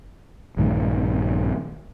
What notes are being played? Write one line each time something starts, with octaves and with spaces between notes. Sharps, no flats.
A#1 G2 D#3 A3